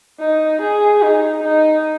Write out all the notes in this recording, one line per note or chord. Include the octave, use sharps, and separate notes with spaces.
D#4
G#4
D#4
D#4